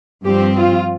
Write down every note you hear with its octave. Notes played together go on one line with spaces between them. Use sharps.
G2 F3 C4 G4
F4